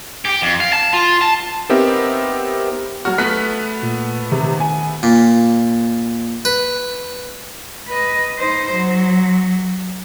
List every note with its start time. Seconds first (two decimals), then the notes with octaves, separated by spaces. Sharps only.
0.25 G4
0.42 F2
0.60 F5
0.73 A5
0.93 F4
1.21 A5
1.69 B3 C4 D#4 G4 A#4 E5
3.05 F#3 F#4 F6
3.18 A3 B3 F#6 B6
3.83 A#2
4.32 C3 D#3
4.60 G#5
5.03 A#2
6.45 B4
7.88 B4 D#5
8.39 D#4 C5
8.72 F#3